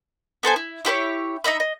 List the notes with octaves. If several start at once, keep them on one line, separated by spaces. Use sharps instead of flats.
B3 A4 C5 G#5
E4
E4 G4 C5 C#5
D#4 D#5 E5 B5
D#5